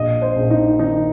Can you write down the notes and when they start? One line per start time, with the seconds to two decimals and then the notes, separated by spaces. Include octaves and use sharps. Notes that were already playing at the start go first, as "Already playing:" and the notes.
Already playing: A#1 D#5
0.22 C5
0.36 A#1
0.51 D#4
0.79 D#3 D#4